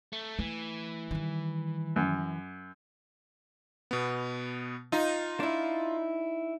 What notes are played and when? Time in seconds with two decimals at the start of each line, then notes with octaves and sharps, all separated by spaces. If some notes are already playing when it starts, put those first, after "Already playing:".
0.13 A3
0.39 E3 A3
1.11 D#3 G3
1.96 F#2
3.91 B2 B3
4.92 D#4 F4
5.40 D4 E4